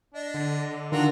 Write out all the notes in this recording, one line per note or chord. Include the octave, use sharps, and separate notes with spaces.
D4 D#5
D3
D#3 D4 F4 F#4 A#4